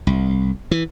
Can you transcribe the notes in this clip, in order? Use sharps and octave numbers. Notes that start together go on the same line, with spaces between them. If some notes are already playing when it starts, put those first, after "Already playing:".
C2
E3